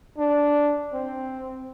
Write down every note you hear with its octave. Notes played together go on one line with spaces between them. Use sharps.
D4
C4